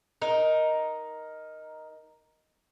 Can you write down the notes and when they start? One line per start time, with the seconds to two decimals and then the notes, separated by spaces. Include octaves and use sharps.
0.22 D#4 A#4